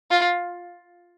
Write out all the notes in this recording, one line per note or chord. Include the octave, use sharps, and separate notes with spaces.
F4